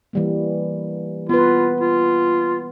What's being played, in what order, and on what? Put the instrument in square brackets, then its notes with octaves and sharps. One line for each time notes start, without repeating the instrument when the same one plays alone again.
[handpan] E3 G3 A#3
[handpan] B3 B4 [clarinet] F4
[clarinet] F4